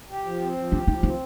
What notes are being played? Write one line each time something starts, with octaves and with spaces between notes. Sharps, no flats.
G4
F3
C4
F3
D4 G4
F3 D#4
C4 D#4